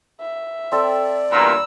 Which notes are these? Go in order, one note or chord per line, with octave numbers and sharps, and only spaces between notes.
E5
C4 A4 D5
E2 G2 A#2 A#5 B5 E6